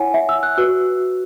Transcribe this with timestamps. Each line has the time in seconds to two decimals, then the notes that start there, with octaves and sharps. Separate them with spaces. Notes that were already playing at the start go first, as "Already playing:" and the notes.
Already playing: E4 C#5 F#5 G#5
0.14 E5
0.29 E6
0.43 F#6
0.58 F#4 B4 E6